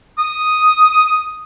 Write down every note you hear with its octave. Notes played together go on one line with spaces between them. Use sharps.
D#6